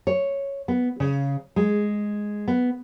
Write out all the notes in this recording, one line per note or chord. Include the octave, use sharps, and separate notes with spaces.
C#5
B3
C#3
G#3
B3